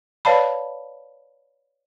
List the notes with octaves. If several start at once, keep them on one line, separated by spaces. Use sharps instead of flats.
B4 C#5 D5 F5 A5 B5